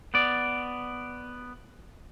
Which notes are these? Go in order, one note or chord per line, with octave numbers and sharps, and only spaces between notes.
B3 D5